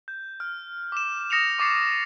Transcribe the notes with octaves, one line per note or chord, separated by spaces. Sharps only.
G6
F6
D6 E7
D#6 A#6 C#7 E7 F7
C#6 D6 A6 C7 C#7